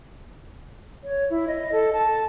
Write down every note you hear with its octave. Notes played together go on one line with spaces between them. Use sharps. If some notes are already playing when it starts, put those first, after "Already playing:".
C#5
E4
D#5
A4
A5